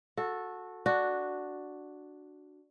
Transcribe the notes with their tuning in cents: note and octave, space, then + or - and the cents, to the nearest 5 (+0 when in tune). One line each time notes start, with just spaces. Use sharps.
F#4 -20 A4 +0
D4 +0 F#4 +0